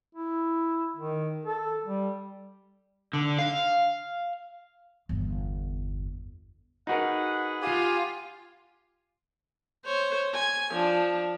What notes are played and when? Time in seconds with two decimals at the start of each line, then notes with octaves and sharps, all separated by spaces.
0.15 E4
0.97 D#3
1.46 A4
1.84 G3
3.13 D3
3.39 F5
5.09 G1 E2
6.87 D#4 F#4 G#4 A#4 B4 F#5
7.62 F4 G4 G#5
9.85 C5 C#5
10.34 G#5
10.73 F3 D4